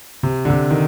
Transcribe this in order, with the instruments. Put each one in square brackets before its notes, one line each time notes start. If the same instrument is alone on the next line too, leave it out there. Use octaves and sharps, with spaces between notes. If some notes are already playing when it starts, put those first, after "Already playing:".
[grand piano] C3
D3
C3
D#3